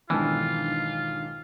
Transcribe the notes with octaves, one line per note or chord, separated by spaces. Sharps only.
B1 G#2 D#3 E3 D4 F4